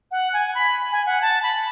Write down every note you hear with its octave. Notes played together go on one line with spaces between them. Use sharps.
F#5
G#5
B5
G#5
F#5
A5
B5